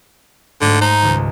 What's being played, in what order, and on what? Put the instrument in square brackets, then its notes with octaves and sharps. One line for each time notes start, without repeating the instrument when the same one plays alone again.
[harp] G#2 A3 [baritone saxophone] D3
[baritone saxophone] D#4 [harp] C5 A#5
[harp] D#1 C#2